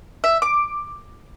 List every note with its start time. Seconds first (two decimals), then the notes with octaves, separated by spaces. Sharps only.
0.24 E5
0.42 D6